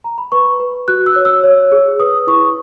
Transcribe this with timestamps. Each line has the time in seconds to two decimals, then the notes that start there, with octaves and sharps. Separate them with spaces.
0.04 A#5
0.18 B5
0.32 B4 C#6
0.60 B4
0.88 F#4 F#6
1.06 E6
1.16 C#5
1.25 E6
1.44 C#5
1.72 G#4
2.00 B4 D#6
2.27 E4 C#6